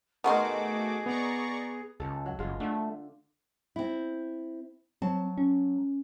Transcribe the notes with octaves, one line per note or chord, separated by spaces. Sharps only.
B2 D#3 A3 F#4 G#4 C6 D6
B3 D5 A#5 C#6
C#2 A4
F#3
F#1 G#3 F4
D3 A3
C4 E4
F#3 C4 A5
C#4